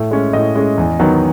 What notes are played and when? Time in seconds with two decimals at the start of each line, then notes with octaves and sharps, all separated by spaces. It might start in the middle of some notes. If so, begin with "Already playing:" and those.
Already playing: A2
0.11 G#3 C#4
0.33 A2 D#5
0.55 G#3 C#4
0.78 E2
1.00 D#3 F#3 B3